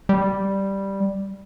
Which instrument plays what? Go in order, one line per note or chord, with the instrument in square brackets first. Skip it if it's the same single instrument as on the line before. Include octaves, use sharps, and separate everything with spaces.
[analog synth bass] G3